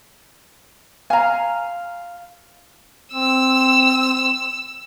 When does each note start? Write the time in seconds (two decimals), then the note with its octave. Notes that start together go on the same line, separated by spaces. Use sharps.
1.10 F5 G#5 A#5
3.13 C4 E6